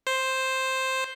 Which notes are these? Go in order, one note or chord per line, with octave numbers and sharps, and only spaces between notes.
C5